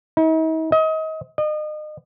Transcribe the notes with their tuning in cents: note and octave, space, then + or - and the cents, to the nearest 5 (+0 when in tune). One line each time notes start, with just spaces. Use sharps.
D#4 +45
D#5 +30
D#5 -35